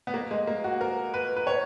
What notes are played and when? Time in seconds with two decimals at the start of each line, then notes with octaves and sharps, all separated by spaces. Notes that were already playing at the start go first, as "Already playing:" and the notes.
0.07 B3
0.14 A#3
0.31 G#3
0.47 A#3
0.64 F#4
0.81 A#4
1.14 B4
1.37 B4
1.47 C#5